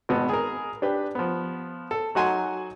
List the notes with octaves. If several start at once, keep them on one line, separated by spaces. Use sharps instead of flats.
G#1 B2 B3
G#4 A#4
D4 G4 B4
F3 B3
A4
F#3 D#4 F#4 F#5 G#5 C6